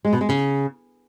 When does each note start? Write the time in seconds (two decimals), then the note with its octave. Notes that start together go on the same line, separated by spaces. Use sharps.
0.05 G#3
0.13 B2
0.21 G#3
0.29 C#3